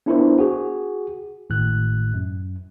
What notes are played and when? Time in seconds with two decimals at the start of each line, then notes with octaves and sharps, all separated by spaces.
0.06 B3 D4 E4 F4 A#4 C5
0.38 F#4 G#4
1.50 G#1 A2 F#6
2.14 F#2